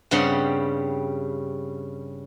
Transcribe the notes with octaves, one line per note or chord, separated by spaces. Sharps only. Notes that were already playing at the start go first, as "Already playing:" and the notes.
G2 C#3 G3 C4 F#5 C6